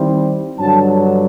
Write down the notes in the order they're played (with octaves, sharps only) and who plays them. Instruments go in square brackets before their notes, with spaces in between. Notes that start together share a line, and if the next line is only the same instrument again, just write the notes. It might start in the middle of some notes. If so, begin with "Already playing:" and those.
Already playing: [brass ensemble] D#3 G3 C4 E4
G2 D3 F#3 A5